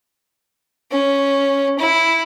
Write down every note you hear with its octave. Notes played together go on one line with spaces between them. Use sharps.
C#4
E4